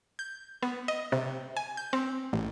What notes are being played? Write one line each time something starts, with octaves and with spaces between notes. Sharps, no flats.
G6
B3
D#5
C3
G#5
G6
C4
A1